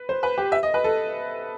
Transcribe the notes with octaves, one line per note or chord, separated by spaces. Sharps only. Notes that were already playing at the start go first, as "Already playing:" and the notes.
Already playing: B4
C5
B4
G4
E5
D#5
B4
A4